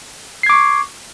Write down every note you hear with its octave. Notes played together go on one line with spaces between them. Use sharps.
C#6 D6 G#6 C7